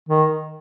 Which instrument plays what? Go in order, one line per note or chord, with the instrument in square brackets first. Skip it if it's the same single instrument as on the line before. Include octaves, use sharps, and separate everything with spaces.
[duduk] D#3